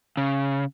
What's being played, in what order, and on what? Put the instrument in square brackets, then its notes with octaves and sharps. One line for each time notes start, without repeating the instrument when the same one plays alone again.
[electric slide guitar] C#3